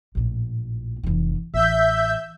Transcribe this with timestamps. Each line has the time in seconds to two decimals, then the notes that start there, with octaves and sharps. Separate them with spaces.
0.15 A#1 A2
1.03 F1 E3
1.54 A1 E5 G6